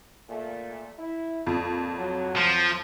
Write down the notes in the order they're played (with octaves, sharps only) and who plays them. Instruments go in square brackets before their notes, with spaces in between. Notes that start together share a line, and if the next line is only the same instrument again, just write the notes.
[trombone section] A#2 A3
E4
[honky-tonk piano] F2 [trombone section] A#2
[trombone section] F#3
[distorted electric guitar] F3